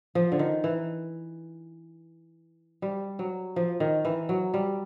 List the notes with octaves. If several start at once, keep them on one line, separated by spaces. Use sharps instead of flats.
F3
D3
D#3
E3
G3
F#3
F3
D#3
E3
F#3
G3